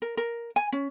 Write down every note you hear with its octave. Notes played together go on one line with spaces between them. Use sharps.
A#4
A#4
G#5
C#4